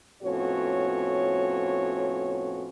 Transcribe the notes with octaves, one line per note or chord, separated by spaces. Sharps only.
F2 A2 B3 C#4 F#4 C#5